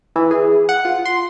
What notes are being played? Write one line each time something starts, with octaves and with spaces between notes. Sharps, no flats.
E3
G#4
F#5
F4
C6